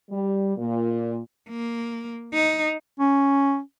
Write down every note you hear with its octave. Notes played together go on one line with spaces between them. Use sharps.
G3
A#2
A#3
D#4
C#4